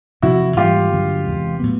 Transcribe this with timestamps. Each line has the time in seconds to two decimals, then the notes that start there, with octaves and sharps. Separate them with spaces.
0.22 E2 C3 F3 E4 F#4
0.56 G#2 E3 G3 A#3 F4 G4
0.91 G2 D3 F#3 A#3
1.25 E2 C3 E3 G#3
1.59 A2 F#3 B3